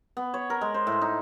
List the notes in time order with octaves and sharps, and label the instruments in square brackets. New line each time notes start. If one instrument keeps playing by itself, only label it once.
[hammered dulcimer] B3
C#5
A#4
G#3
C5
A2
D#4